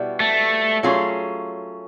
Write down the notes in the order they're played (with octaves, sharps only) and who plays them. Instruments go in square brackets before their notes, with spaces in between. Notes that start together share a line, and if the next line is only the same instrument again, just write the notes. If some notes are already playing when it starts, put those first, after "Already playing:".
Already playing: [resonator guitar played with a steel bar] B2 G3 B3 E4
[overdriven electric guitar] A3
[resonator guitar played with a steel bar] F#3 A3 C#4 F4 G#4